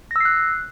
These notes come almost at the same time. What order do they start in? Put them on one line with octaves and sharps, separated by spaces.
A#6 E6 C7 F#6